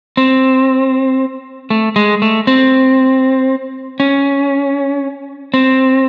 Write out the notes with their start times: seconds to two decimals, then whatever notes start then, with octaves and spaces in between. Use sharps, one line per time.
0.17 C4
1.70 A3
1.96 G#3
2.22 A3
2.47 C4
4.00 C#4
5.54 C4